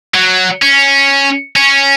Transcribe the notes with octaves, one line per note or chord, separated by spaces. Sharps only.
F#3
C#4
C#4